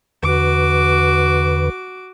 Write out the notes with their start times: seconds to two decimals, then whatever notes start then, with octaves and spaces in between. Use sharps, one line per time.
0.23 E2 D3 F#4 B4 D6